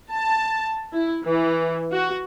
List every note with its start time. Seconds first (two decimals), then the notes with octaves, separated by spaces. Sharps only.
0.11 A5
0.93 E4
1.24 E3
1.92 F#4